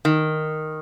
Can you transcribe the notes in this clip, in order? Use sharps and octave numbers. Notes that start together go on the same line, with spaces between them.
D#3